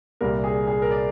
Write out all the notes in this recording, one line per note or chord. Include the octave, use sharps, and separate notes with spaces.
C2 A#2 G3 A#4
G#4
G#4
A#4
D5